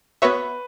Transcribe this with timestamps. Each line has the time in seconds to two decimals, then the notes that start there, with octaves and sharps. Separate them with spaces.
0.22 B3 F#4 B4 C#5 E5